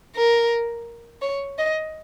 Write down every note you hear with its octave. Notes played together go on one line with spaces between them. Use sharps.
A#4
C#5
D#5